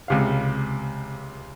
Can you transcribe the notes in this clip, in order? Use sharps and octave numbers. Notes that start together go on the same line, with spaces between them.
C#2 C3 F5